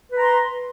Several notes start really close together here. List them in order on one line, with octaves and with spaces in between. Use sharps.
B4 A#5 C6